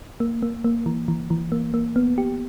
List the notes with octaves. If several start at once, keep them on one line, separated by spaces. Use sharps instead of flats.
A#3
A#3
A#3
E3
E3
E3
A#3
A#3
B3
G4